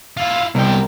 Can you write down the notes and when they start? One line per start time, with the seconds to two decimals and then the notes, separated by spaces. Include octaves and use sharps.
0.17 E4 F4
0.55 C2 B2 G5